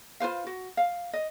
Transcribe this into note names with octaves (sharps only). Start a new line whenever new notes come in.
F4 B4 C5 F5
F#4
F5
D#5